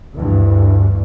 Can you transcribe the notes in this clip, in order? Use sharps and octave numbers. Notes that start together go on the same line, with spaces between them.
D2 G2 E3